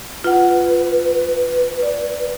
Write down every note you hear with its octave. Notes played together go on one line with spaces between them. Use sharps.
F4 B4 F#5
D5